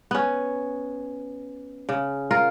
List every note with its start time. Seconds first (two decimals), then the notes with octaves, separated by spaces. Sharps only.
0.11 B3 C#4
1.89 C#3
2.31 F4 A#4